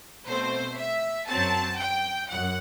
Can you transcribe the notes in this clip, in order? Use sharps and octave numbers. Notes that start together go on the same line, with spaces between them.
B2 A3 C4 C5
E5
F#2 F#3 C4 A5
G5
F#2 F#5